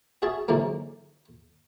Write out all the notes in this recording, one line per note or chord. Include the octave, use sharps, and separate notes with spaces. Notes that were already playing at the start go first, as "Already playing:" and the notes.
F#4 G#4 E5 A5
G#2 D3 E3 F#3 A#3